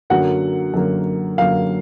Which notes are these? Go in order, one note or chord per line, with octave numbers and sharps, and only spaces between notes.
F#2 D3 F#3 A#3 F#5
F#2 D3 F#3 A#3
F#2 D3 F#3 A#3 F5